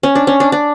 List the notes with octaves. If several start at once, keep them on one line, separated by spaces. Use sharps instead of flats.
C#4
D4
C#4
D4
D4